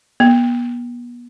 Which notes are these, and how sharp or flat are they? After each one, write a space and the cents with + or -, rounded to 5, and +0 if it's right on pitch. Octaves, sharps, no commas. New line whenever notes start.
B3 -35